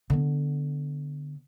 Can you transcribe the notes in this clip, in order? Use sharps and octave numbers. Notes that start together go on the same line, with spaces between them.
D3 B3